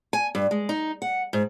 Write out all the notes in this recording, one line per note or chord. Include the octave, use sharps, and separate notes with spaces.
G#5
G2
G#3
D#4
F#5
G#2